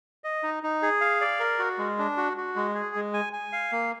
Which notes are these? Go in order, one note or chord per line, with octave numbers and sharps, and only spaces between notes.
D#5
D#4
D#4
G#4
F5
D5
A#4
F#4
G#3
D4
F#4
F#4
G#3
G#4
G#3
G#5
G#5
F5
A#3